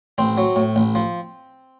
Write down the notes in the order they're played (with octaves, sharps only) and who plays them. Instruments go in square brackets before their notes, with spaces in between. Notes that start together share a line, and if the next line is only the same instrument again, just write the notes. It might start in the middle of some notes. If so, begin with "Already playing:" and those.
[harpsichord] A1 C4
F#3
A2
A1
F3